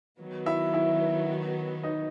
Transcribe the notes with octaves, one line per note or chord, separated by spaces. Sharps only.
D#3 F#3 B3
E4 E5
E4 E5
D#4 D#5